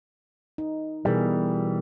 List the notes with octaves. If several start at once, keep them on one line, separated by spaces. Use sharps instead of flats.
D#4
B2 E3 G3 G#4 A#4